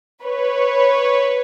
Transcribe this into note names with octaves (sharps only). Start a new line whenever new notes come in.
B4 C#5